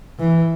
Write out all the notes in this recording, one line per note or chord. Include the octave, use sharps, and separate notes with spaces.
E3